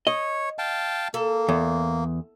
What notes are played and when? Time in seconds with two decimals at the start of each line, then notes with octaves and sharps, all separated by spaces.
0.07 C#5 D#5
0.59 F5 G5 A5
1.14 A#3 A4
1.49 E2